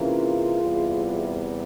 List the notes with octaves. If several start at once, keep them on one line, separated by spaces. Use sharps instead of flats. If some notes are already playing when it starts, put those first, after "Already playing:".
Already playing: C3 E3 A#3 C#4 F4 G#4
E2 C3 G3